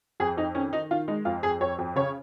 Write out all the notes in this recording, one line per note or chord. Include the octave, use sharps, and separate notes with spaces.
F2 G#4
F2 D#4
D#3 C#4
D#3 D#4
D#3 F4
G#3 D#4
F2 F4
F2 G#4
F2 C#5
F2
C#3 C#5